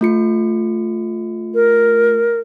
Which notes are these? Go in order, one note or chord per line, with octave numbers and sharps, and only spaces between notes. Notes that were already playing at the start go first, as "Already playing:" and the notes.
A3 F4 C#7
A#4